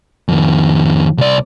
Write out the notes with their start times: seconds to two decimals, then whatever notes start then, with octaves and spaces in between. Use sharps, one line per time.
0.28 F2 D#3
1.18 C2 D5